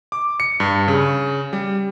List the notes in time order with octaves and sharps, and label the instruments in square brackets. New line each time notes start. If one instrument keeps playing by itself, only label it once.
[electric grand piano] D6
C#7
G2
C#3
G3